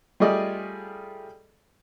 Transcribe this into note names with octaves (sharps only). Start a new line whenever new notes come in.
G3 A3 F4 G#4 D5 D#5